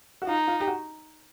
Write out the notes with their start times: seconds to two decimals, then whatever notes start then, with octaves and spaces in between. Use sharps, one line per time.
0.22 F#4
0.27 D#4 F4
0.48 F4
0.60 G4
0.67 F#4